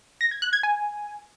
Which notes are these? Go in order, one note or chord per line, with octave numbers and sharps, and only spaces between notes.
A#6
G#6
F#6
G#6
G#5